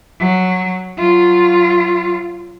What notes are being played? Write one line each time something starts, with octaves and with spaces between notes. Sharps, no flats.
F#3
F#3 F4